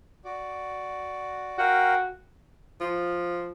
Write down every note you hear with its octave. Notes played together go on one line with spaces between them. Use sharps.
F#4 D5
F#4 A#4 F5 G5
F3